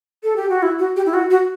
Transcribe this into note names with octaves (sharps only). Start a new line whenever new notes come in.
A4
G4
F#4
E4
F#4
G4
E4
F#4
F#4